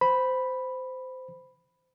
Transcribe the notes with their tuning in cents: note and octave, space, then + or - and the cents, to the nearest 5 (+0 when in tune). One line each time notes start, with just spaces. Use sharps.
C5 -20 B5 +0